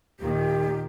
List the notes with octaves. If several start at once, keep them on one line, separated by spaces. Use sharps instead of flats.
D#2 A#2 D#3 G4